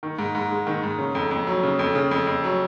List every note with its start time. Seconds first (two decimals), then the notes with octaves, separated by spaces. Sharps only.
0.03 D#3
0.19 G#2
0.35 G#2
0.51 G#3
0.67 D#3
0.83 G#2
0.98 C#3
1.15 F2
1.31 F2
1.47 F#3
1.63 C#3
1.79 F2
1.95 C#3
2.11 F2
2.27 F2
2.44 F#3